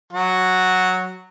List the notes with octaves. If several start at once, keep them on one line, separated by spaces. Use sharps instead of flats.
F#3 F#4